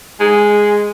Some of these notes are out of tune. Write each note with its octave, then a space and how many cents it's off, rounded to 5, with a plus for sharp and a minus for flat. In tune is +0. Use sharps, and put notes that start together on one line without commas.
G#3 +0